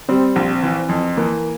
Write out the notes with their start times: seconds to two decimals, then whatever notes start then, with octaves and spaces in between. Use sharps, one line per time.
0.08 G3 C4
0.36 A#1
0.63 E3
0.89 F2
1.17 E3 A#3